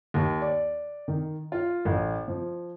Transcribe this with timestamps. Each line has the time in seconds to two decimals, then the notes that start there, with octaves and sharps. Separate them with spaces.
0.14 D#2
0.42 D5
1.08 D#3
1.52 F4
1.85 A1
2.28 F3